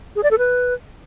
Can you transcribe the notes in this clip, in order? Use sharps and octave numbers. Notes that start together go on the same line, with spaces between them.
G#4
D5
A4
B4